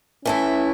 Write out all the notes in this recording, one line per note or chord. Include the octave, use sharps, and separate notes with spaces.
E3 A3 C#4 E4